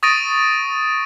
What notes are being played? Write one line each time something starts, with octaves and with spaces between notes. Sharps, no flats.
C#6 D#6 A6 A#6 D7 D#7